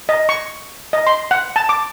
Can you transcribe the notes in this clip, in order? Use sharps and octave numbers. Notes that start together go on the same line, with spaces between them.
D#5
C#6
D#5
C6
F#5
A5
D6